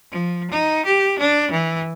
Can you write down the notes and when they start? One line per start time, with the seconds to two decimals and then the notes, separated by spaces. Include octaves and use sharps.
0.11 F3
0.51 D#4
0.86 G4
1.19 D4
1.51 E3